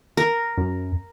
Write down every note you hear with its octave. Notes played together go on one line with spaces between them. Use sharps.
A#4
F#2